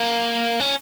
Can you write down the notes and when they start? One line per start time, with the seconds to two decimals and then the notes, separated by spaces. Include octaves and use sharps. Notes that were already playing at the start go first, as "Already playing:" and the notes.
Already playing: A#3
0.60 C#4